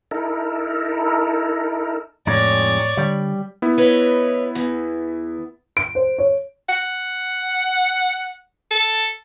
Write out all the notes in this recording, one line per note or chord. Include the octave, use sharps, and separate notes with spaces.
D#4 E4 A4 A#4
F2 A2 G#3 D#4 C#5 D5
D3 G3
B3 E4
B4 C#5 D#5
E2
D7
C5
C#5
F#5
A4